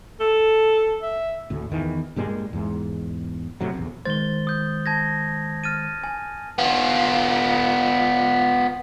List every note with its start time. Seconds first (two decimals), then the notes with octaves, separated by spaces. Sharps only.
0.20 A4
1.02 E5
1.50 D2 A2
1.71 E2 D#3 E3
2.16 G2 A#2 G3 G#3
2.53 E2 G#2
3.61 A2 C3 F#3
3.74 A#1 E2
4.05 D#3 G#3 C5 A6 G7
4.47 D#6 G6
4.86 A5 G#6 A#6
5.64 F6 A6 D#7
6.04 G#5
6.58 B3 F4